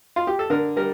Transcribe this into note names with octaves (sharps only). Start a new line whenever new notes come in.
F4
G4
A4
D3 A#4
G3 A#4